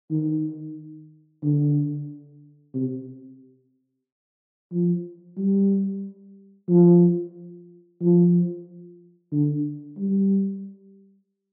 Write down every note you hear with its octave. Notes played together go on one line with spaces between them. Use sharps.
D#3
D3
C3
F3
G3
F3
F3
D3
G3